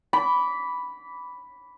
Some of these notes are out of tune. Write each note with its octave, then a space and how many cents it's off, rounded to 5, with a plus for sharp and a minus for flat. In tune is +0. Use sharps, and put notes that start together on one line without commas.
B5 +0 D6 -25